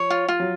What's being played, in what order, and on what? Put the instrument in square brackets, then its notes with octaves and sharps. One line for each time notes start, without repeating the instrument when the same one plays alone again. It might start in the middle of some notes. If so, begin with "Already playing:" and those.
Already playing: [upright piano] F3 [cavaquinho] C#5
[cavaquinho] F4
F4
[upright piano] F#3